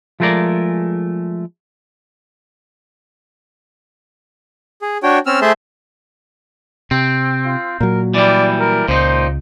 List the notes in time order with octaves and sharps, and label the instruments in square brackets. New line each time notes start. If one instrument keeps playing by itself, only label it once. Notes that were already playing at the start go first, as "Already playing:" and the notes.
[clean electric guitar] F3 G#3 A3 G#4 A#4 D5
[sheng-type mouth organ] G#4
D4 F#4 C#5 G5
C4 C#4 E6 F6
A3 G#4 C5 E5 A5 C6
[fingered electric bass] C3 [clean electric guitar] C4
[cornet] F4
[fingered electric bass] A#2 F#3 [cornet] A#4
[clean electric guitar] E3 G3 [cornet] D5
[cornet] A#4
[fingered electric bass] C#2 [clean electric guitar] A#2 D#4 [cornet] C5